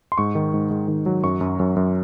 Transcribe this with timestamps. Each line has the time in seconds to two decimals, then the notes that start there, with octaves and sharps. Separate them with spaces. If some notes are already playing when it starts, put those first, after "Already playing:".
0.12 C6
0.18 G#2 C#6
0.35 D#3
0.54 G#2
0.71 G#2
0.88 D#3
1.06 F#3
1.24 F#2 C#6
1.41 F#2
1.60 F#2
1.76 F#2